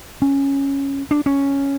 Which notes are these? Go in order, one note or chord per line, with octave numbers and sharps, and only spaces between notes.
C#4
D4
C#4